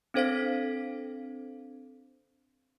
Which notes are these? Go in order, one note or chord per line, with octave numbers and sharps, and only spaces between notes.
C4 D4 A4 C5 F5 B6